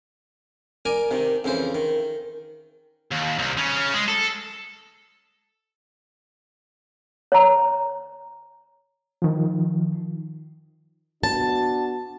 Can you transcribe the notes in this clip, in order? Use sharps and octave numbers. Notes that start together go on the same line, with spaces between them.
A#4 D5 G#5 A#5
C3 D#3
F2 C#3 E3 C5
D#3
D#2
C2
C#3 C#4
G#3
A4
C#5 A#5
D#3 F3
B3 D4 F#4 A5